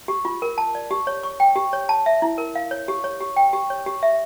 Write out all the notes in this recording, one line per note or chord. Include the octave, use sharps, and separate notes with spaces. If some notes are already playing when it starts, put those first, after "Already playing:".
G4
F4
A#4
A5
D5
G4
C#5
C#6
G5
G4
C#5
A5
E5
E4
A#4
F5
C#5
G4
C#5
G4
G5
G4
C#5
G4
E5